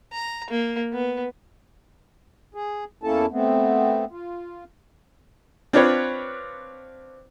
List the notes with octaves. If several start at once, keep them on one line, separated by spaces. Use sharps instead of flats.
A#5
A#3
B3
G#4
E2 A#3 C#4 E4 A4 A5
A3 B3 C4
F4
C4 D4 F4 B4 C#5